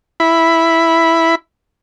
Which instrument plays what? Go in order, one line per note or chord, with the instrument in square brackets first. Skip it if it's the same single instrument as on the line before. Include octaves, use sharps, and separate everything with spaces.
[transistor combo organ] E4 B5